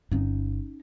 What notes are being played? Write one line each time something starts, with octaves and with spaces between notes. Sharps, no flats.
G1 C#4 D#4